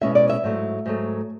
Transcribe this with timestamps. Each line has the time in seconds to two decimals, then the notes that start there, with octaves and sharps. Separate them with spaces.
0.01 B2 G#3 C#4 E4 E5
0.15 D5
0.30 E5
0.44 G#2 F#3 A3 E4
0.86 G#2 F#3 A3